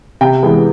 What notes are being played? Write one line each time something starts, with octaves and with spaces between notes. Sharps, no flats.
C3 G5
E3 G#3 B3